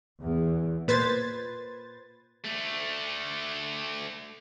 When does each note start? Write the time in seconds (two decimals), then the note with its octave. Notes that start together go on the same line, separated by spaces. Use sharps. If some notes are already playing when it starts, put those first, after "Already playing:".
0.22 E2
0.88 A#2 B4 C5 G#6 A6
2.44 D3 A3